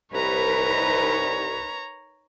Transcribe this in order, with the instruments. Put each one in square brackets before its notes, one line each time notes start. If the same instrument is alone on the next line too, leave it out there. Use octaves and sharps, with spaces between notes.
[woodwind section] C2 [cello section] D#4 A#4 B4 [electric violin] C#5 A#5